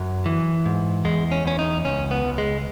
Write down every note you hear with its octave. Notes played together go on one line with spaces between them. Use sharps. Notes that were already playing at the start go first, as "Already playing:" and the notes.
Already playing: F#2 F#3
E3
G#2
E2 G#3
C#4
E2 C#4
D#4
C#2 C#4
B3
C#2
G#3